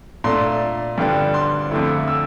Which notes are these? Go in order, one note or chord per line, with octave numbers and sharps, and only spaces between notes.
A#2 A3 D4 C6
G2 D3 G3 D4
C6
F2 D3 A3 E4
E6